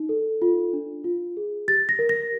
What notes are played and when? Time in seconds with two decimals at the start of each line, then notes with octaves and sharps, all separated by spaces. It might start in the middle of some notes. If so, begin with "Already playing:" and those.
Already playing: D#4
0.09 A4
0.42 F4
0.73 D4
1.04 F4
1.37 G#4
1.68 G4 A6
1.89 A#6
1.99 A#4
2.09 A#6